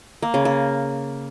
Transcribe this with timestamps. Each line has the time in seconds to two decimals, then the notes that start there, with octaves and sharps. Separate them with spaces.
0.22 A#3
0.34 C#3
0.45 A#3